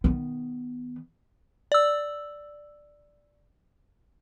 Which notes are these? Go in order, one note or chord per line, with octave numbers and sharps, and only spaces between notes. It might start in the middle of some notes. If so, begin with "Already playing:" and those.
D#3 B3
D5 E6